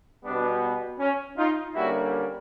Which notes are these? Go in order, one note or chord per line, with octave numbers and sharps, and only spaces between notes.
B2 G3 B3 D4
C#4
D#4 F4
D3 G3 A#3 C#4 E4 F#4